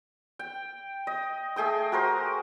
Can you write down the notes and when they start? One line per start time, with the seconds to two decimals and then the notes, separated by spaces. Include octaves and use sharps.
0.39 G5
1.07 D#5
1.56 A3 G#4 G5 D#6
1.92 F#4 A#4 C5